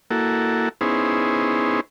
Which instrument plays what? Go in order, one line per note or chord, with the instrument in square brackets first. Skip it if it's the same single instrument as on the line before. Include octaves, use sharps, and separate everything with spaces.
[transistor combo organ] A#3 E4 F#4 A4
B3 C#4 D#4 E4 G#4 C5